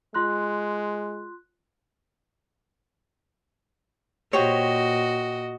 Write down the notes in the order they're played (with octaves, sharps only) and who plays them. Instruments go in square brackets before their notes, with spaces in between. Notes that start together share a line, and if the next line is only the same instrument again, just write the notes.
[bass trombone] G#3 [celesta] F4 C6 F#6
[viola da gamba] A#2 F#4 D#5 [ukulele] G4 C5 C#5